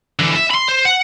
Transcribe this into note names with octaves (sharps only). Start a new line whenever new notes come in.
D3 E3
E5
B5 C6
C5
F#5